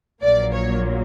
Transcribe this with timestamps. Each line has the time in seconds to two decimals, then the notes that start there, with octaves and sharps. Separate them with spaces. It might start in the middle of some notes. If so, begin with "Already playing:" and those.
0.22 A#1 A#2 F#3 A#3 D5
0.53 C#5